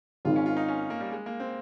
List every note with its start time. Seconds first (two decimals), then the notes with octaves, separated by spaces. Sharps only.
0.25 G#1 G#2 D#3 F4
0.36 C#4
0.46 F4
0.57 D#4
0.68 C#4
0.90 A#3
1.00 G3
1.12 G#3
1.26 A#3
1.40 C4